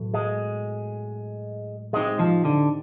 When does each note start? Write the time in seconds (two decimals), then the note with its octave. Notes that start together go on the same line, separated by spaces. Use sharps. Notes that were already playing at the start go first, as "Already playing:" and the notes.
Already playing: A2 F#3 B3
0.14 G#3
1.93 G#3 C4 D#4 G4
2.19 F3
2.45 D3